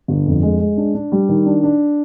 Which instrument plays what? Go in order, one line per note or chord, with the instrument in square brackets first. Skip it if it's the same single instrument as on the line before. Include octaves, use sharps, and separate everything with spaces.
[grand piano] G1
F2
G#3
G#3
D4
D4
G3
D#3
D4
D4